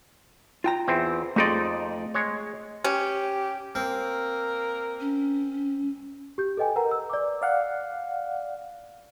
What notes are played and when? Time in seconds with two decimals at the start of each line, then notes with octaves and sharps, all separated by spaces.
0.64 F4 G5 A#5
0.88 E2 C4
1.36 F2 A3 D#4 G#4 D5 C6
2.14 G#3 C#5
2.84 C#4 G4
3.75 A#3 C4
5.00 C#4
6.38 G4 G6
6.57 A4 B4 D#5 G5 G#5
6.76 A#4 B4 F#5 A#5
6.91 E6
7.10 D5 D6
7.42 D5 F5 F#5